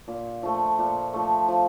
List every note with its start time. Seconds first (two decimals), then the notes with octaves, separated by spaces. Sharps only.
0.08 A#2
0.43 F3 A3
0.79 A#2
1.13 F3 A3
1.48 F3